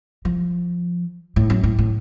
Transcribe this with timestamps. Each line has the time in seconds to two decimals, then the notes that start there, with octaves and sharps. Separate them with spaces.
0.25 F3
1.36 A2
1.50 F#2
1.63 A2
1.79 A2